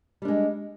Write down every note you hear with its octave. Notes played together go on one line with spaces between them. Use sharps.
G3 G#3 D4